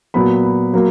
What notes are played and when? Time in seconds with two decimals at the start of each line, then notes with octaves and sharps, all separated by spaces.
0.14 A#2 F#3 B3 B5
0.44 B5
0.73 F#3 A#3